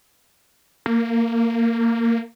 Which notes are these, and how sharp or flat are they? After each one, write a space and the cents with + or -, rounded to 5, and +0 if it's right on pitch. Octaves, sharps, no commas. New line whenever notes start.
A#3 -15